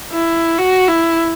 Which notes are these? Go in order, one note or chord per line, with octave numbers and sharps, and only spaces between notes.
E4
F#4
E4